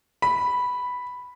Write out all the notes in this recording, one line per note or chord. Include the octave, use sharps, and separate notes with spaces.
B5